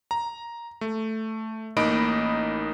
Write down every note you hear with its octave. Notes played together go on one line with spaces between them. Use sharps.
A#5
A3
A1 A#3 D#4 D#5 B5 D7